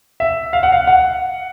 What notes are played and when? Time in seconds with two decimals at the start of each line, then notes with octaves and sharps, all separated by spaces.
0.20 E5
0.53 F5
0.63 F#5
0.72 F5
0.87 F#5